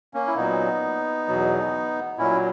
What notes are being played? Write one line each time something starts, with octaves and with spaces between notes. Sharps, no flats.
A#3 C#4
E4
A#2 F#3 B3 D#4
E2 B2 F#3
A#2 F#3 C#4 E4